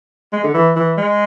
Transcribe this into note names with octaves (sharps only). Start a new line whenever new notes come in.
G#3
D3
E3
E3
G#3